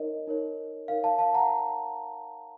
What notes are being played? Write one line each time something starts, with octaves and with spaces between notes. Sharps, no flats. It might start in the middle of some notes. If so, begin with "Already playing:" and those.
Already playing: D#4 A#4 C#5 D#5
D#4 A#4 C#5
D#4 A#4 C#5 F5
F5 A5
F5 A5
F#5 A#5